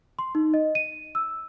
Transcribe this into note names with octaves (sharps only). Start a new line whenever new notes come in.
C6
D#4
D#5
D#7
E6